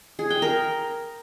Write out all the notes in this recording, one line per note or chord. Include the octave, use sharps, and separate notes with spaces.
G#4
G5
A#4